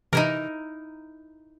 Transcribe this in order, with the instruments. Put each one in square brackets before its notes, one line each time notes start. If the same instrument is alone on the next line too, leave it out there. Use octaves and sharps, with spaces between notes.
[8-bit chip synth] C3 E3 [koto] D#4 E4 A#4